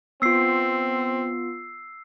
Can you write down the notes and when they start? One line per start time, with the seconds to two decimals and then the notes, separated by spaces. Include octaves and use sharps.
0.22 B3 C4 F4 E6 C7